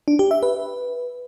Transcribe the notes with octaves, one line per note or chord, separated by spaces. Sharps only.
D4
G4
E5
B4